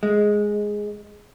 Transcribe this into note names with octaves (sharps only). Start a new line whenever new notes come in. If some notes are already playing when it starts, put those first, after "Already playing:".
G#3